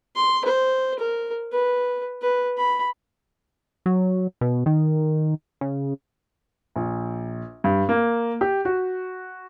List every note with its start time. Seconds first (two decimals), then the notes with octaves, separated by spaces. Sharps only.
0.16 C6
0.45 C5
0.99 A#4
1.52 B4
2.22 B4
2.57 B5
3.86 F#3
4.41 B2
4.66 D#3
5.61 C#3
6.76 A#1
7.64 G2
7.89 A#3
8.41 G4
8.65 F#4